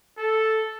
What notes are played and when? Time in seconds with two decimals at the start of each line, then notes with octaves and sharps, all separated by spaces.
0.18 A4